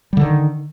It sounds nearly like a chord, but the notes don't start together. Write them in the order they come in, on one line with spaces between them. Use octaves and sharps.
G3 D3 D#3